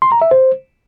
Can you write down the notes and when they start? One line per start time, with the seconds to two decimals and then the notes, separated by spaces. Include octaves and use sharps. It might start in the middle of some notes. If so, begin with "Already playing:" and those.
0.02 C6
0.12 A#5
0.22 E5
0.31 C5